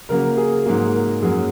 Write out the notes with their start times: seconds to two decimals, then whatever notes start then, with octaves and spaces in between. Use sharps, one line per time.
0.09 C#3 F#3 A#3 A#4
0.37 G#4
0.66 G#2 F#3 A#3 G#4
0.95 A#4
1.22 F#2 F#3 A#3 G#4